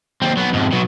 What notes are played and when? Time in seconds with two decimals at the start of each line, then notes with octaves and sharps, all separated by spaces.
0.22 D#2 C4
0.37 F#3 B3
0.53 F2 G#2
0.72 B2 F#3